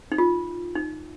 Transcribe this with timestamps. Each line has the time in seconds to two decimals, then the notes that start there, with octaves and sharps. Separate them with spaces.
0.12 D#4
0.18 F4
0.75 D#4